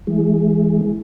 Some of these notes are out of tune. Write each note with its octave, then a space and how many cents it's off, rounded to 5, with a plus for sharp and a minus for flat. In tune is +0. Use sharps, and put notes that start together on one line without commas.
E3 +0 G#3 +0